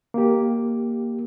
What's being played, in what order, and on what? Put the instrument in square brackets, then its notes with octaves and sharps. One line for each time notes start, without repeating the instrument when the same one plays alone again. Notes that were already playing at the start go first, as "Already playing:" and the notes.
[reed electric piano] A#3 G4